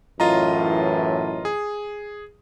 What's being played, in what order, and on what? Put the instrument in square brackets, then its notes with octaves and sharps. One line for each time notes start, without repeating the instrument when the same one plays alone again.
[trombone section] F#2 A2 E3 [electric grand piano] F4 D#5 A#5
[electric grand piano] G#4